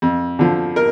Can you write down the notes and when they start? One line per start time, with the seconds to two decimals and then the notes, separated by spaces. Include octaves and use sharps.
0.02 F2
0.39 D3 F3
0.76 A#4